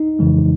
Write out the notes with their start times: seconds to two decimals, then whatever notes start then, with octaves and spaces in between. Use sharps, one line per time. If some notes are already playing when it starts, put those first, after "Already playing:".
Already playing: D#4
0.19 F2 C#3 E3 G#3